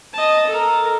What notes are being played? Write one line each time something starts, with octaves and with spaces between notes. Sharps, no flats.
D#5 A5
A4 A#4